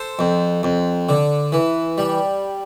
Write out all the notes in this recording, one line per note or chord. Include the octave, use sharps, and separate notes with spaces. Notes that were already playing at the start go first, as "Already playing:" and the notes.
Already playing: A4 C5
F2
F2
D3
E3
G3